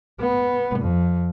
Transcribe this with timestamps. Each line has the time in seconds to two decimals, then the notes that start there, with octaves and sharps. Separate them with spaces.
0.20 B3
0.80 F2